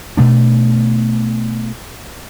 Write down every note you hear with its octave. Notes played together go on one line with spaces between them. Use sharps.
B2 A3 D4